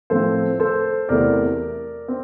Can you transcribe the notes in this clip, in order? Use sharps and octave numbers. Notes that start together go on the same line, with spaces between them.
A2 F3 A3 C4 A4 C5
A4 C5
E2 C3 E3 A3 A#4 D5
C4